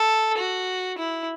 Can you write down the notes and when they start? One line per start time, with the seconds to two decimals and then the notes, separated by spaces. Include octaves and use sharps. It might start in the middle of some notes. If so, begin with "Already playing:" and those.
Already playing: A4
0.38 F#4
0.98 E4